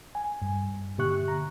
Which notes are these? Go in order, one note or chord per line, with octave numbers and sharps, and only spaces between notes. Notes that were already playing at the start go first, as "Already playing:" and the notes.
G#5
G2
A#2 D3 G4 E5 C#6 F#6
A#5